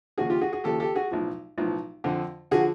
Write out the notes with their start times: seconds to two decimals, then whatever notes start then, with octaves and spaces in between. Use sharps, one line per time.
0.17 D#2 C#3 F3 F#4 G#4
0.30 F4 G4
0.41 F#4 G#4
0.52 F#4 G#4
0.64 D#2 C#3 F3 G4 A4
0.80 G4 A4
0.95 F#4 G#4
1.11 B1 A2 F3
1.58 B1 A2 F3
2.04 F2 D3 F3
2.51 D3 F3 F#4 G#4